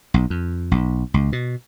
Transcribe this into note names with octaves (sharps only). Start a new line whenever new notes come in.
B1
F2
B1
C#2
B2